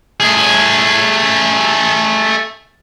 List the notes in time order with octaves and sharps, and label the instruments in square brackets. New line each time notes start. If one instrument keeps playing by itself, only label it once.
[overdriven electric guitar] A3 G#4